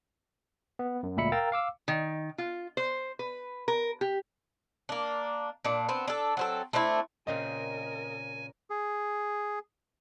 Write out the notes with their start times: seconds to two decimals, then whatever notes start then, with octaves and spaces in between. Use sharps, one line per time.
0.79 B3
1.03 F#2
1.17 D2 A#2 G#3 E5 B5 C#7
1.32 A#4 F5 G5 A#5 E6 A6
1.52 F5 D6 E6
1.88 D#3
2.38 F4
2.77 C5
3.19 B4
3.68 A#4
4.01 G4
4.89 A#3 D4
5.64 A#2 D4
5.89 B3 C4
6.08 D4 A4
6.37 F#3 C4 A4
6.73 A3 C4 D4 E4
7.27 A#2 C#3 C4 A#4 D#5 G#5
8.70 G#4